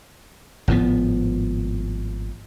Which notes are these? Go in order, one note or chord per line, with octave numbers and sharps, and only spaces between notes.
G#1 A2 F3 B3